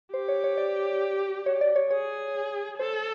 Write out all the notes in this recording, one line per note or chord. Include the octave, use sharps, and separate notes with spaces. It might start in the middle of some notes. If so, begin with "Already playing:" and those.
G4 C5
C#5
C#5
D5
C#5
D5
C#5
G#4 C#5
A4 C5